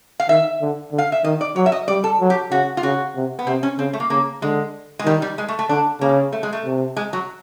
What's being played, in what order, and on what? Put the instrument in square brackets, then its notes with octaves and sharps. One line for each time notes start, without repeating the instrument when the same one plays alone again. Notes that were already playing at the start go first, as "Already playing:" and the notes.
[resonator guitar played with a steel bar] F5
[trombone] D#3 [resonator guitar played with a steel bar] E5
[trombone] D3
D3
[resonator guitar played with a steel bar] F5
E5
[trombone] D#3 [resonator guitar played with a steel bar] D#5
[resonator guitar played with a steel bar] D5
[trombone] F#3 [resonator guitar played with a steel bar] C#5
[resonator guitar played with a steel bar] E5
D#5
[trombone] G3 [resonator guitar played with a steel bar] D5
[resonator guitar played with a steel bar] A4
[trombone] F#3
[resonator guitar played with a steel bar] G4
[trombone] C#3 [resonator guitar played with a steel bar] F#4
[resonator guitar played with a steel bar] F4
[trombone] C#3 [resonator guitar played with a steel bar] F#4
[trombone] C3
[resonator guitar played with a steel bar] B3
[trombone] C3 [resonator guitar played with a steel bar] C4
[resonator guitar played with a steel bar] C#4
[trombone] C#3 [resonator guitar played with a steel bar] C4
[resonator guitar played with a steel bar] A3
A#3
[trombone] C#3 [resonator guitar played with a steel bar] A#3
[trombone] D3 [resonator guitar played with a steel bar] G#3
[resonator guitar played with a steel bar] G#3
[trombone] D#3 [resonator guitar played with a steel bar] G3
[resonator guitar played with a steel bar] G3
G#3
A3
A3
[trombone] D3 [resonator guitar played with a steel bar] D4
[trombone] C#3 [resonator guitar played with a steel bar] A#3
[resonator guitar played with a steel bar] A3
G#3
A3
[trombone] C3
[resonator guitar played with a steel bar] G#3
F#3